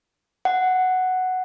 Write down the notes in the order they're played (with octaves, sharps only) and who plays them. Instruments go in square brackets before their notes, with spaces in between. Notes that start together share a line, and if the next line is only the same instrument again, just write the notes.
[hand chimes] F#5